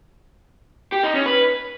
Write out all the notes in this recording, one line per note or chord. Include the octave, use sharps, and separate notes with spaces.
G4
D#4
C#4
B4